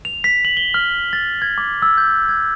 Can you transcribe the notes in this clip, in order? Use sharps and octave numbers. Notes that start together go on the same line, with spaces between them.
F7
B6
F#7
G7
F6
A6
G#6
D6
E6
G6
G#6